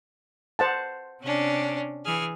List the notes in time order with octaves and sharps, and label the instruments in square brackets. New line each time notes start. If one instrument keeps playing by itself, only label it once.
[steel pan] C5 F#5 A5
[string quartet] C3 C#4 D4
E3 G#4 F6